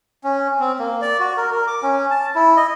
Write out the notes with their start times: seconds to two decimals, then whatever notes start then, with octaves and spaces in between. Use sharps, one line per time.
0.24 C#4
0.60 C4
0.79 A#3
1.02 D5
1.20 F#4
1.37 A#4
1.52 A#4
1.67 D6
1.83 C#4
2.11 A5
2.35 E4
2.57 D#5